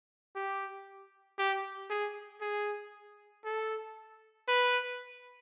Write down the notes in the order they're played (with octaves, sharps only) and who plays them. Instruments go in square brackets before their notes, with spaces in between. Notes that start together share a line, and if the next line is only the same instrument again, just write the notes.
[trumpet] G4
G4
G#4
G#4
A4
B4